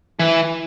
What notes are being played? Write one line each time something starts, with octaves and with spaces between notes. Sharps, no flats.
E3